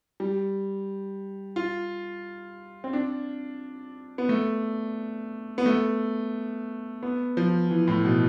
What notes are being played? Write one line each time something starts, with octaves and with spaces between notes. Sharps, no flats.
G3
F4
C4
D4
B3
A3
B3
A3
B3
F3
E3
A2
B2